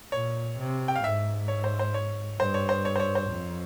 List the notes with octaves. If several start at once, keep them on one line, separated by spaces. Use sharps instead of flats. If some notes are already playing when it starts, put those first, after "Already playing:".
A#2 C#5
C3
G5
F5
G#2 E5
C#5
C5
C5
C#5
G2 C5
C#5
C5
C#5
C5
C#5
C5
F2